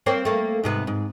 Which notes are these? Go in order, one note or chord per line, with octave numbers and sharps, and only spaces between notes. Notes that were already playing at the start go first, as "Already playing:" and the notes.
A#3 C4 C#5
A3 A#3
G#2 C3 B3
G#2